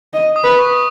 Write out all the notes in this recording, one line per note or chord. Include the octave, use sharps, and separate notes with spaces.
D#5
D#6
B4
C#6